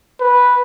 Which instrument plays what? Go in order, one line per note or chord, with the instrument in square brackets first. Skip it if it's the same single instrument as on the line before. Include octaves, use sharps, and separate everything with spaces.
[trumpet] B4